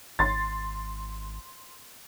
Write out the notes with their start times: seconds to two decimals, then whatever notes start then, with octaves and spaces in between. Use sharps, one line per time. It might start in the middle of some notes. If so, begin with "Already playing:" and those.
0.19 G#1 C6 A6